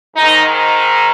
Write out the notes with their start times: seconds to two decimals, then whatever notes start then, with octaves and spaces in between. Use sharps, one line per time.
0.16 G#2 D#3 D#4